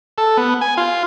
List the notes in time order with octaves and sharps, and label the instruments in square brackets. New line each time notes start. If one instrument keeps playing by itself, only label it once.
[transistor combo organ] A4
B3
G#5
F4